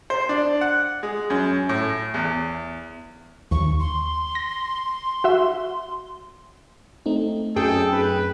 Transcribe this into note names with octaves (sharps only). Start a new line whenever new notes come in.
C5
D4
F#5
G#3
F#2
A2
E2
D#2 C#6
C6
A#6
F#4 E5
A3 C4 D#4
F#2 G#4 A4 G5
B4